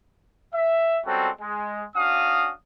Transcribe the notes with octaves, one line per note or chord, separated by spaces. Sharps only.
E5
G3 G#3 C4 C#4 F#4 A4
G#3
C#4 D4 F#4 F5 D#6